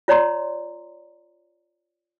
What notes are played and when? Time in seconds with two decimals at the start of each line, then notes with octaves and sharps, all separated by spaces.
0.08 F4 C#5 D5 A#5 C6